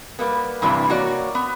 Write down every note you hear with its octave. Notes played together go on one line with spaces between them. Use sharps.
G3 A#3 B3
G2 C3 E3 G3
A#3 F#4 C#5 D5
B3